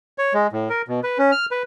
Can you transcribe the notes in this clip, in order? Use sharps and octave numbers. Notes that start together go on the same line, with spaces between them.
C#5
G#3
A2
A#4
B2
B4
C#4
F6
B4